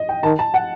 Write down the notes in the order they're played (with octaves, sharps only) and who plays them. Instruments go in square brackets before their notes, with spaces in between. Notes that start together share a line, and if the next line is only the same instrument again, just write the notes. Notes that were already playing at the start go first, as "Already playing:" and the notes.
Already playing: [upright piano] D#5
G5
[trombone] D#3 [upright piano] A5
[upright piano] A5
F#5